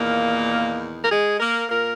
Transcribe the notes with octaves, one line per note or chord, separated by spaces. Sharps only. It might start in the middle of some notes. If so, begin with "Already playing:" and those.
Already playing: E2 A#2 D#3 A#3
A#4
G#3 G#4
A#3 A#4
A#2 A#3 A#4